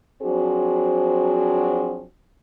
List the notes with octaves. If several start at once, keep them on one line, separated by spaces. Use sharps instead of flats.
F3 F#3 C4 D4 F#4 G#4